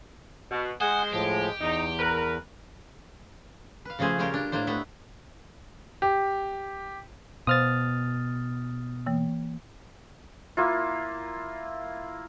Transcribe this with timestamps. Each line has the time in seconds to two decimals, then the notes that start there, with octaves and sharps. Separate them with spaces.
0.51 B2
0.81 G#3 C5 F#5 G#5 D#6
1.13 A2 F3 G4
1.61 E2 D#4
1.99 A#4 B4
3.85 B4 F5
3.99 C#3 F3 A3 G#4 C5
4.19 C#3 G3 C#4 F4 G4 A#4
4.34 D4
4.52 A2 A#3 D4 C5
4.67 A3 B3 E5
6.02 G4
7.47 B2 C5 F5 C6 D#6 F6 A6
9.06 E3 A#3
10.57 A#3 E4 F4